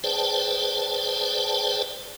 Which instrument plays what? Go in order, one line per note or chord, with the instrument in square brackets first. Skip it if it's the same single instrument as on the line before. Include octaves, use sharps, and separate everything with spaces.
[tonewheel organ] G#4 B4 C5 D5 G5 A5